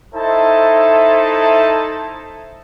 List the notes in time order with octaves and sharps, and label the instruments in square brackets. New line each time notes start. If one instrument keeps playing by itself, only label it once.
[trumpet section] D#4 E4 A4 C5 E5 A5